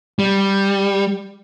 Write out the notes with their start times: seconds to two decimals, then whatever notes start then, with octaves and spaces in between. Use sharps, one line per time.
0.19 G3